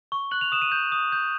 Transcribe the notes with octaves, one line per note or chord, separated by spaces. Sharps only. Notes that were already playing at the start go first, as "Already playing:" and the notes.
C#6
F#6 F#7
F7
D#6 E7
D#7
G6
D#6
G6